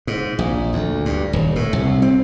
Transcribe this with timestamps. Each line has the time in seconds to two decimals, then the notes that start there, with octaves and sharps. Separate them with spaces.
0.07 G#2
0.39 A#1
0.73 D2
1.05 G2
1.33 D#1
1.56 A2
1.73 C2
2.02 C4